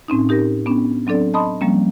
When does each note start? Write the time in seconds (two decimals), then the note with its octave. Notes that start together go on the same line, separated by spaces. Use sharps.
0.08 A2 C4 C#4 D#4
0.29 D#4 G4 A#4 A#6
0.66 B3 C#4 D4
1.07 F#3 C4 D4 A4 D5
1.34 D#5 A5 B5 C6 D#6
1.61 F3 G3 A#3 C4 C#4